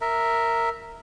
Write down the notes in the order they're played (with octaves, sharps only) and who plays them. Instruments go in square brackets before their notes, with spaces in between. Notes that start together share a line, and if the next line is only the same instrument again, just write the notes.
[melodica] A#4 E5